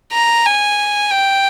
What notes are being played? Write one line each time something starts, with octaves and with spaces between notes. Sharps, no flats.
A#5
G#5
G5